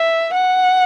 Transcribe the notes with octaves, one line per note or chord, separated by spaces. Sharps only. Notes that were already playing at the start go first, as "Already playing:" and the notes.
Already playing: E5
F#5